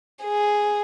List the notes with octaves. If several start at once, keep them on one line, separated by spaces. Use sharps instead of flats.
G#4